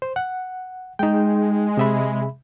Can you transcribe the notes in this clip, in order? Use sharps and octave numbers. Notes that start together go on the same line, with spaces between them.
C5
F#5
G#3 D#4 G5
C3 E5 B5